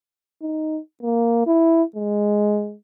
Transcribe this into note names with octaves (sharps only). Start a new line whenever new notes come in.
D#4
A#3
E4
G#3